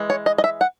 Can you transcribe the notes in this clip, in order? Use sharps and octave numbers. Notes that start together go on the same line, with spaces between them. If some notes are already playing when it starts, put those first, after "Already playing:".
Already playing: E3 G#3
C#5
D#5
D#5
E5
F#5